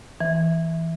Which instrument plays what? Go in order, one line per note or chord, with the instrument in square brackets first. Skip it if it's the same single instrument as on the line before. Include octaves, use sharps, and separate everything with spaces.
[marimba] E3